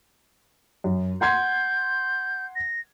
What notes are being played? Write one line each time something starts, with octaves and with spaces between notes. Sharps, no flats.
F#2
F#5 C6 G6 G#6
A#6